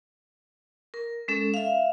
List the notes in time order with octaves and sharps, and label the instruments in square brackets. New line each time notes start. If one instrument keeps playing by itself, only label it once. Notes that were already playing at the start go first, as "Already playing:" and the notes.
[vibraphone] A#4
G#3 C#4 A4
E5 F5